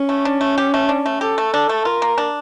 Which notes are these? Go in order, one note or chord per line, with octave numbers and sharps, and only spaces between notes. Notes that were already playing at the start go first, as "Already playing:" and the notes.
Already playing: C#4
A3
D4
A3
G4
A3
D4
A3
G4 A4
A3
D4
A3
F4 A#4
A#3
D4